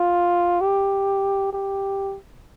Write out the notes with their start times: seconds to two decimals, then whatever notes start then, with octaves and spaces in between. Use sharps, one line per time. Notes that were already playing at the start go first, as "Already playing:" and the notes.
Already playing: F4
0.61 G4
1.53 G4